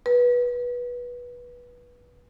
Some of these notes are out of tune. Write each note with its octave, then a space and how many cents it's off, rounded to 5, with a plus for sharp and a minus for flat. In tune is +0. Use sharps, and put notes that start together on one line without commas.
B4 -20